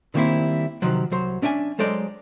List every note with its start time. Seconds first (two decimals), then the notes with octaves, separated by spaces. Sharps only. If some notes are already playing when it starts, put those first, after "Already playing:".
0.14 D3 D#3 G3 A#3 C4 E4
0.82 C3 D#3 F3 F#3
1.11 C2 F#3 C5
1.42 C#4 D4 E5 G5 G#5
1.79 F#3 G#3 A4 C5 D5 D#5